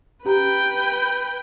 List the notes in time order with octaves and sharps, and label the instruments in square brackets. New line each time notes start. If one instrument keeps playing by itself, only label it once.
[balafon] C#4 G4 A#5 [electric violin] B4 G5